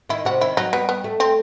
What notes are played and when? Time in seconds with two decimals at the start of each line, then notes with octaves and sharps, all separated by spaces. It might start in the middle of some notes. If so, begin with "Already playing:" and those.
0.09 D#3 E4
0.25 C3 F#4
0.41 D#3 E4
0.57 F#3 D#4
0.73 G3 B3
0.89 B3
1.04 A3
1.20 C4